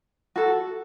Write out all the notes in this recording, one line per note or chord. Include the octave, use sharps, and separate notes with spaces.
F#4 A4